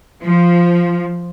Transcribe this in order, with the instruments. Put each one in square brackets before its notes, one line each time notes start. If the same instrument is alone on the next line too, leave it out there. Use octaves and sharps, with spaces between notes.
[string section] F3